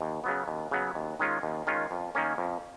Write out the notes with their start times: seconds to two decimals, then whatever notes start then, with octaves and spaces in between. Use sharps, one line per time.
0.01 D#2
0.24 C#3 F#3 B3
0.48 D#2
0.71 C#3 F#3 B3
0.95 D#2
1.19 D#3 G#3 C#4 F4
1.43 D#2
1.67 D#3 G#3 C#4 F4
1.91 F2
2.15 D#3 A#3 C#4
2.38 F2